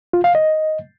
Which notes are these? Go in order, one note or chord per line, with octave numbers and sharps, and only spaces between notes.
F4
F5
D#5